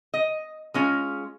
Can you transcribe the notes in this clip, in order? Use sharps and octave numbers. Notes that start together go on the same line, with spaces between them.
D#5
G#3 C#4 F4